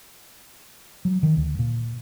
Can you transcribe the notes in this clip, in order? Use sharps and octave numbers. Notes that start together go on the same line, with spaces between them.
F#3
D#3
D2
A#2